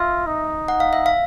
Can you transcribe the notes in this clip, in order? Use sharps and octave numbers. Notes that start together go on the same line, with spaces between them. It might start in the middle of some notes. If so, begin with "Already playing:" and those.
Already playing: F4 E5
D#4
F#5
F5
E5
F5